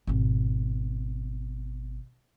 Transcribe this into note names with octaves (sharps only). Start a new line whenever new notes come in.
G#1 B2